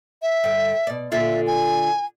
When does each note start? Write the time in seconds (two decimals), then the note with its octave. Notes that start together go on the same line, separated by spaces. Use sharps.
0.22 E5
0.44 G2 D3
0.87 B2 D5
1.12 A#2 D3 F4 E5
1.47 G#5